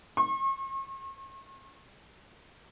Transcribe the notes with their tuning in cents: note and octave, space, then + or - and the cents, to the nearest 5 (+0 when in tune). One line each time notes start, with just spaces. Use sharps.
C#6 -45